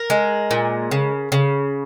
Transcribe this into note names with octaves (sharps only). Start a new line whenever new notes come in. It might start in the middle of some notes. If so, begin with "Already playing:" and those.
Already playing: A#4
G#3
A#2
C#3
C#3